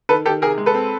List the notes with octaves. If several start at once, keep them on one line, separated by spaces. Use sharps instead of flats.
D#3 A4 B4
D#3 G4 A4
C3 G#4 A#4
G#3
A4 B4
C4